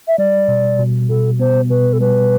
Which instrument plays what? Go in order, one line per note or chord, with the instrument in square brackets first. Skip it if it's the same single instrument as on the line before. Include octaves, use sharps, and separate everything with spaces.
[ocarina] E5
[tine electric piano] G3 [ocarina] D5
[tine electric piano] B2
B2
[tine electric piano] B2 [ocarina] A4
[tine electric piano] B3 [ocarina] C5
[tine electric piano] B2 [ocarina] B4
[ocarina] A4
[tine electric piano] G3 [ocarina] B4